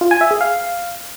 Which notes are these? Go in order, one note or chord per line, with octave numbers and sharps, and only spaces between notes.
F4
G#5
E5
G#4
F5